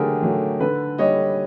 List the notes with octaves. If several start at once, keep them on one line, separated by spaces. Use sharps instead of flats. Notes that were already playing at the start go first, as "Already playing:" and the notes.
Already playing: D3 F#3 A3 G4 G#4 A#4
F#3 A3
D3 A4 B4
G3 C#5 D#5